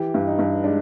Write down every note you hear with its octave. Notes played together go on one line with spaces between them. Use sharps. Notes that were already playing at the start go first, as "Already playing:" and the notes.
Already playing: E3 G4
G2
D#4
G2
G#3 D4